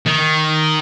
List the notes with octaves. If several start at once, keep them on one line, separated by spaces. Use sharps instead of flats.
D#3